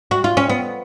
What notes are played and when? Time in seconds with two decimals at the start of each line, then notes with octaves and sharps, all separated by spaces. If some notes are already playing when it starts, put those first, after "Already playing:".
0.11 F#4
0.24 F4
0.37 C#4
0.49 B3